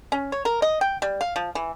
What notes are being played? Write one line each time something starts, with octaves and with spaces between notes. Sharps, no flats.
C#4
C#5
A#4
D#5
G5
G3
F5
F3
E3